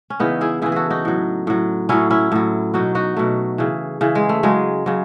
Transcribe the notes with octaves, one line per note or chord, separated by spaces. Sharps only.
C#4
C#3 E3 B3 D#4
E4 G#4
C#3 E3 E4 G#4
F#4 G#4 A4
D#4 F#4
A2 F#3
A2 F#3
A2 F#3 C#4 E4
C#4 E4
A2 F#3
B2 F#3 D#4 F#4
D#4 F#4
B2 F#3 A3
C#3 E3
C#3 E3
G#3
A3
C#3 F#3 G#3
C#3 F#3